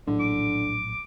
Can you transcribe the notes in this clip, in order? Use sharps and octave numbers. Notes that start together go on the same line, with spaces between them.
A#1 A2 D3 F#3
D6